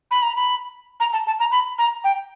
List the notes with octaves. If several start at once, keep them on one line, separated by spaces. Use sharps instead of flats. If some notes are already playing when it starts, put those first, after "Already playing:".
B5
A#5
B5
A#5
A5
A5
A#5
B5
A#5
G5